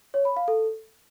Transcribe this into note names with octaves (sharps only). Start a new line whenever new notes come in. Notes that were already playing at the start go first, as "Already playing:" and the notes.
C#5
B5
F5
A4